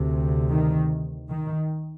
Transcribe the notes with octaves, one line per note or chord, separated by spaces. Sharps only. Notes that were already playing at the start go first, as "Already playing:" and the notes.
Already playing: D2 C3
D#3
D#3